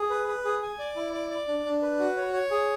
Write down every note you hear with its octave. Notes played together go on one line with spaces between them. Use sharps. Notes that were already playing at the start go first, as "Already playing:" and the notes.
Already playing: G#4
B4
B4
G#4
G#5
D5
E4
D5
D5
D4
D4
B4
F#4
C#5
C#5
G#4